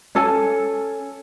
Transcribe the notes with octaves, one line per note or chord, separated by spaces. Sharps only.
C#4 A4 G#5